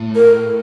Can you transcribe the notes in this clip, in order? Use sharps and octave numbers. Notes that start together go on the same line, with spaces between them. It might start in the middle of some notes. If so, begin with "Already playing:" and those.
Already playing: A2
A#4